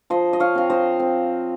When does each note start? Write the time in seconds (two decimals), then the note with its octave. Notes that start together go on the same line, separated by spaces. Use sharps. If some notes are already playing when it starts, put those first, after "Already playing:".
0.10 F3 C5 D#5
0.33 D#5
0.40 C#5 F5
0.55 C4 F5
0.70 C5 D#5
0.99 C4